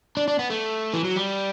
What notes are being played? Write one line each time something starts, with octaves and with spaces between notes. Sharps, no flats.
D4
D4
B3
A3
E3
F#3
G3